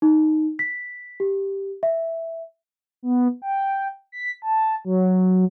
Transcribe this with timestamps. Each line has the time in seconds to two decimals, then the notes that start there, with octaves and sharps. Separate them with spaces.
0.02 D#4
0.59 B6
1.20 G4
1.83 E5
3.03 B3
3.42 G5
4.12 B6
4.42 A5
4.85 F#3